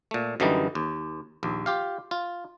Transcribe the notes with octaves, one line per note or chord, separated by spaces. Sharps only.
A#2 A3
F#2 D3 E3 G3 D#4
D#2
A#1 D#2
F4 G4 F5
F4